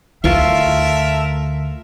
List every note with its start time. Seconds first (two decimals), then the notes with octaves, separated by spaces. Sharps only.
0.24 D2 A3 F4 A#4 E5 F5 C#6